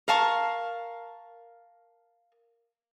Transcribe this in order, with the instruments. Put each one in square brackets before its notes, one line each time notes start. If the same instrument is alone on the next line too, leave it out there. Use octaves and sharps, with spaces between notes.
[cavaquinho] A#4 F5 A5 C#6